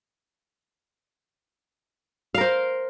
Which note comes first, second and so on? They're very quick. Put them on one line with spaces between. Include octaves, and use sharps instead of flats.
F5 A#4 C5